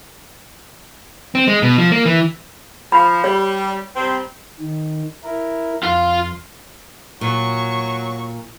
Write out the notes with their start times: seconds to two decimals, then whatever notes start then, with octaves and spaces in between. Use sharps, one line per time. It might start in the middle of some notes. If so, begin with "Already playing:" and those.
1.35 C4
1.47 G#3
1.62 B2
1.78 F3
1.91 A#3
2.06 E3
2.92 F3 B5
3.24 G3 C#5
3.96 C3 G3 C4
4.59 D#3
5.24 E4 A#4
5.83 F2 F4 F5 C6
7.21 A#2 F#3 C#6